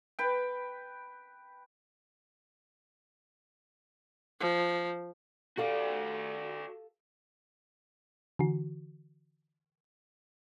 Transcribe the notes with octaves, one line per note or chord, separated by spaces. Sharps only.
B4 G5
F3
F#4 G4 A4 D5 F5
D3 E3 F#4